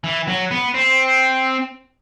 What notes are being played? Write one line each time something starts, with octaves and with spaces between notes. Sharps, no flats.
E3
F#3
B3
C4